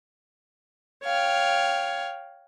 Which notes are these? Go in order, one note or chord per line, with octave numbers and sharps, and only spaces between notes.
C#5 F5 G5